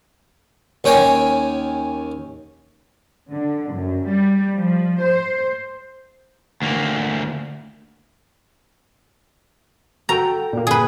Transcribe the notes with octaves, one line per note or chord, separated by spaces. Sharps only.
D#2 C#4 G5 G#5
D3
F#2
G3
F3
C5
D2 A#3
F#4 A4 G5 A#5
A#2 A#3
G#4 B4